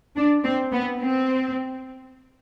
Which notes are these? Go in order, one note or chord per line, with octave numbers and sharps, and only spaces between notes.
D4
C4
B3
C4